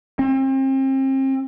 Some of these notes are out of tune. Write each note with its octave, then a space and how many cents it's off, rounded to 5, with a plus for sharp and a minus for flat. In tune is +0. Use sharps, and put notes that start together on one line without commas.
C4 +35